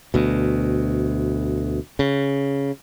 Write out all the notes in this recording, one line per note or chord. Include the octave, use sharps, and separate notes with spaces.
D2 B2
C#3